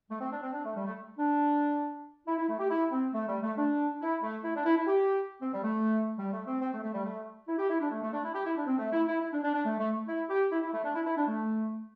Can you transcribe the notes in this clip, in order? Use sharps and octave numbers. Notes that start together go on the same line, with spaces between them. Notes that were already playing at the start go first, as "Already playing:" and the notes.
A3
C4
D4
C4
D4
A3
G3
A3
D4
E4
E4
A3
G4
E4
C4
A3
G3
A3
D4
E4
A3
E4
D4
E4
E4
G4
C4
G3
A3
G3
A3
C4
C4
A3
A3
G3
A3
E4
G4
E4
D4
A3
A3
D4
E4
G4
E4
D4
C4
A3
E4
E4
E4
D4
D4
D4
A3
A3
E4
G4
E4
E4
A3
D4
E4
E4
D4
A3